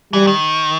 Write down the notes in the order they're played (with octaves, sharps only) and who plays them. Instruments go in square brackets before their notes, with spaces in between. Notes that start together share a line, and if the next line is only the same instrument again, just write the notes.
[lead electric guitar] E3 [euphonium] G3
[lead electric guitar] D#3